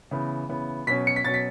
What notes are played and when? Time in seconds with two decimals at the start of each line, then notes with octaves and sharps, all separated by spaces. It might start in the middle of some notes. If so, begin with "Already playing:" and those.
0.11 C#3 E3 B3
0.49 C#3 E3 B3
0.87 B2 F#3 C#4 B6
1.07 C#7
1.16 B6
1.25 B2 F#3 C#4 A6
1.34 B6